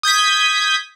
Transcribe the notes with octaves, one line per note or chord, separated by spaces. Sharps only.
D#6 G6 G#6 B6